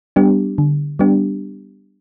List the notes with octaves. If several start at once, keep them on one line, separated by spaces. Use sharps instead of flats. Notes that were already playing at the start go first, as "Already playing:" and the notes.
G3 B3 D4 G4
D3
G3 B3 D4 G4